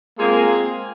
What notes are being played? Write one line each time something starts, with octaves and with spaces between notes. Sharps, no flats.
G#3 A#3 C4 F4 G#4